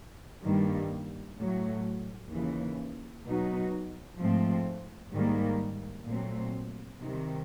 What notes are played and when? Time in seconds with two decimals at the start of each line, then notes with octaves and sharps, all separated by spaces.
0.43 G2 D#3 G3 A#3
1.38 A2 F#3 A3
2.30 D#2 C#3 E3
3.24 B2 F#3 B3 D#4 F#4
4.19 G#2 F3 A3 C4
5.12 G#2 D#3 G3 A#3
6.06 A#2 F#3 A3 C4
7.00 C3 D#3 G3